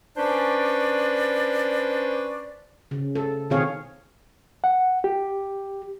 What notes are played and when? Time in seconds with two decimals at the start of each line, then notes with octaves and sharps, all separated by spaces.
0.17 C#4 D4 B4 C5 D5
2.91 C#3
3.15 A4
3.50 B2 D#3 C4 G#4 C#5 F5
4.64 F#5
5.04 G4